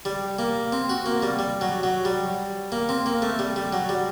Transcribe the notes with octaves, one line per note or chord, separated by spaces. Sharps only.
G3
A#3
C4
F#4
A#3
G3
G3
F#3
F#3
G3
A#3
C4
A#3
A3
G3
G3
F#3
G3